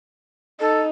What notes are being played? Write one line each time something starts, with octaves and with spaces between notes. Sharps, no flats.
D#4 A4